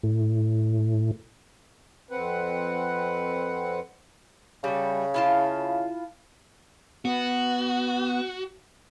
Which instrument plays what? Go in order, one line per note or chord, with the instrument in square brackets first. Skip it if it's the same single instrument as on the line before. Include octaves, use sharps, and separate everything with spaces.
[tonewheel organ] A2
[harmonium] F2 C4 B4 F#5
[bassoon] C#3 [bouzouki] G3 A3
[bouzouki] E4 F4 A5
[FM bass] B3 [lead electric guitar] F#4